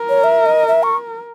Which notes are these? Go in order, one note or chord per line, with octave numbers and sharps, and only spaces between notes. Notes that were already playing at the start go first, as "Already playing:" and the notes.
Already playing: A#4
C#5
E5
D#5
E5
C#6